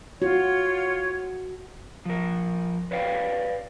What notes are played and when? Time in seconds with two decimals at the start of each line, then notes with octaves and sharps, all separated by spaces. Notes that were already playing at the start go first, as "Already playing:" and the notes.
0.22 F4 F#4 C#5
2.05 F3 A#4
2.91 B4 C#5 D5 F5 G5